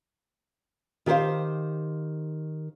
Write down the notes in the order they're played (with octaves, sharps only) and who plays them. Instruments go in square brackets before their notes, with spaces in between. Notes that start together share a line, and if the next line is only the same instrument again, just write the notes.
[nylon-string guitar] D#3 G4 G#4 C5 F5